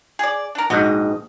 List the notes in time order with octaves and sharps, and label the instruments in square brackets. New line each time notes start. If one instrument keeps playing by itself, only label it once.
[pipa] G#4 D5
D4 A#4
[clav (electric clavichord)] A#1 G#2 [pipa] F#4 G4 D#5